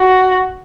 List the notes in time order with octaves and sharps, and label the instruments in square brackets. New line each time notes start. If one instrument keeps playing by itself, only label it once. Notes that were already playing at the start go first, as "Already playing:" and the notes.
Already playing: [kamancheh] F#4